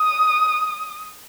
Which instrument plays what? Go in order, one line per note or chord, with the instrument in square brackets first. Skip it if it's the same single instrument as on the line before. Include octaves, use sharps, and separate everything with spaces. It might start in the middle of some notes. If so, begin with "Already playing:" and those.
Already playing: [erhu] D#6